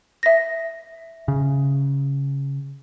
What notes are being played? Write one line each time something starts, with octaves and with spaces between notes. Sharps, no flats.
E5 A#6
C#3